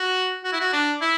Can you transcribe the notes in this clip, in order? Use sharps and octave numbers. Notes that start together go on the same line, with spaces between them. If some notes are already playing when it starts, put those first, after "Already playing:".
Already playing: F#4
F#4
E4
F#4
D4
E4